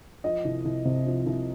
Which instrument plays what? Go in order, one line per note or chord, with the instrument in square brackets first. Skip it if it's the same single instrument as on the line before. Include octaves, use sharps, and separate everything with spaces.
[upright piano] F3 D#5
C2
C2
C3
F3
C2